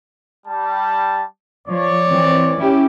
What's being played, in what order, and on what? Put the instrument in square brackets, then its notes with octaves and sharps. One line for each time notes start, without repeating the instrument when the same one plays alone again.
[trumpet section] G3 A5
[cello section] F3 [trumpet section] C#5 D5
[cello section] E3 C4
C#4 E4 G4